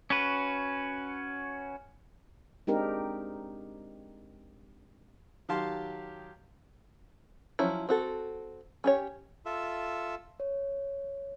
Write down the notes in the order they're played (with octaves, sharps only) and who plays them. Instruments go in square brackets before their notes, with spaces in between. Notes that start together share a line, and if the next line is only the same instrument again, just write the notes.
[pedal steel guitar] C#4 F#4 B4
[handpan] G#3 C4 D4 D#4 G4 A#4
[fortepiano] D#3 F#3 G4 F5 A5 C6
[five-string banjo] F3 F#3 C#4 E4
C4 F#4 A4
C#4 G4 C#5
[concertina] F4 A4 E5
[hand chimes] C#5